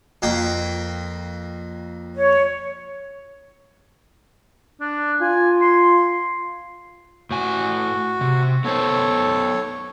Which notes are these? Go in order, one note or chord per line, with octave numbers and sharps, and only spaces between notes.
F2 A#3 G5
C#5
D4
F4 G#5
C6
A2 F#4 G#5
C3
B3 D#4 A4 C5 C#5